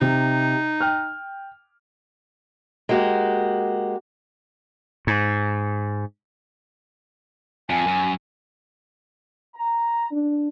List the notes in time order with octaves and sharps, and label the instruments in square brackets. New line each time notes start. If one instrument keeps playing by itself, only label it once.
[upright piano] C3 [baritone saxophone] D#4
[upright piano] G5 F6
[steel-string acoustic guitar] G#3 A#3 F#4 G4
[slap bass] G#2
[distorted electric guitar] F2 [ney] G#5
[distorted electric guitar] F#2
[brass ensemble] A#5
D4